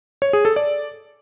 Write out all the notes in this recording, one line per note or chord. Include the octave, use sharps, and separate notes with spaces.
C#5
G#4
A4
D5